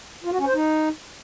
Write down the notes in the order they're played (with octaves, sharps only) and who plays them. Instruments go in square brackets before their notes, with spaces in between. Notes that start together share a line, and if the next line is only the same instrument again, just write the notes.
[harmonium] F4
F#4
C#4
C5
D#4